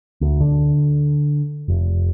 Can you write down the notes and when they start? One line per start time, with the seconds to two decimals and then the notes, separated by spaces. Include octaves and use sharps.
0.21 D2
0.41 D3
1.68 F1